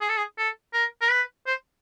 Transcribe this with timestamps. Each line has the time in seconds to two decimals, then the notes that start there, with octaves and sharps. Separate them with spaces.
0.01 G#4
0.09 A4
0.17 G#4
0.38 A4
0.73 A#4
1.01 A#4
1.10 B4
1.47 C5